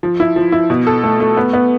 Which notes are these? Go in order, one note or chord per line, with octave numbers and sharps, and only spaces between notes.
F3
E4
F3
E4
B2
A4
A3
A3
B3
B3